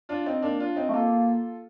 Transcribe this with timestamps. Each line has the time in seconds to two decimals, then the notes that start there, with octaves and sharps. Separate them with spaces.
0.09 D4 F4
0.26 C4 D#4
0.42 A#3 D4
0.60 D4 F4
0.76 C4 D#4
0.89 A3
0.92 A#3 F4 A4